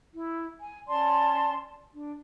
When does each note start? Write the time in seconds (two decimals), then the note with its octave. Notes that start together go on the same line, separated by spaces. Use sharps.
0.14 E4
0.61 G#5
0.88 C#4 D5 A5 C6
1.92 D4